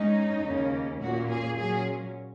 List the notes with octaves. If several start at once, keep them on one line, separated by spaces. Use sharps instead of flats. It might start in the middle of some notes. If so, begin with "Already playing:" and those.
Already playing: G#2 G#3 C#4 D#4
D#2 C#3 A#3 C#4
A#2 A#3 C#4 F#4
G#4
A#2 F#3 C#4 G#4